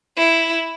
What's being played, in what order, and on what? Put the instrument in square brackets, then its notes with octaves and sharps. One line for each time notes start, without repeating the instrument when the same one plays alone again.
[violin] E4